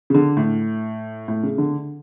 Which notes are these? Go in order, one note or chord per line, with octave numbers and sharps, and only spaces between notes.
C#3
D3
A2
A2
C#3
D3